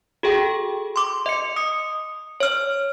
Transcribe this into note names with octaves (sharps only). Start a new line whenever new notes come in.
F#4 G#4 A4 G5
C6 D6
D#5 C#7
D#6 C#7
C#5 F6